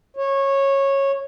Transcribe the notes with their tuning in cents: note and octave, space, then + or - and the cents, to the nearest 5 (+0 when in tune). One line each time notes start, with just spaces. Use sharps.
C#5 -15